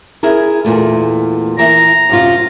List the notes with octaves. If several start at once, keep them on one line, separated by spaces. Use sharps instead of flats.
E4 G#4 A#4
E2 A#2 A3
E3 A#4 E5 A#5
F#2 C3 F4